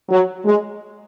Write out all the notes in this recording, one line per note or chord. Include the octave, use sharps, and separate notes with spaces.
F#3
G#3